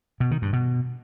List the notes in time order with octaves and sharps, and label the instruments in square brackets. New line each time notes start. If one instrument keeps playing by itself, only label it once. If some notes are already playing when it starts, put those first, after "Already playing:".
[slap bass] B2
D#3
G2
B2